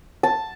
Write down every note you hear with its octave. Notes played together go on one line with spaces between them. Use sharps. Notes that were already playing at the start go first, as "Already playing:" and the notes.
A5